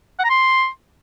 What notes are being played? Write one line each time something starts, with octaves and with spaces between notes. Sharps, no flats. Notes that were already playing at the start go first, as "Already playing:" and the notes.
F#5
A#5
C6